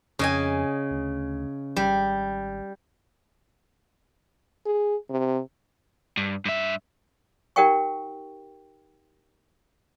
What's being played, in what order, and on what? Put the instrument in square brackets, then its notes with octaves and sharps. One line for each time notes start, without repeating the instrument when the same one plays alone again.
[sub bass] F2 [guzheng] C#3 D#5 G#5
[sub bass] D2
[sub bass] G#1 [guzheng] G3
[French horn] G#4
C3
[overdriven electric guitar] G2
G2 E5
[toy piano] D#4 G4 A#4 F#5 G5 C#6